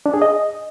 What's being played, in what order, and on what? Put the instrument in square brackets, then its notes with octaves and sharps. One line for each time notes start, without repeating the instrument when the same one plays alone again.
[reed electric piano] D4
G#4
D#5